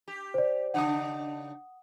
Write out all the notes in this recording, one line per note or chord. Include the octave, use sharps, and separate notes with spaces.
G4
C5 D5
C#3 D4 D#4 F#5 D#6